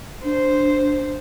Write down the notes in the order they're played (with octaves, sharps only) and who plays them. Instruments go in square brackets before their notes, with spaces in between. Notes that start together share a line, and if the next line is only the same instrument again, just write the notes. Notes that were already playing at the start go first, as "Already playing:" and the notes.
[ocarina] D4 [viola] C5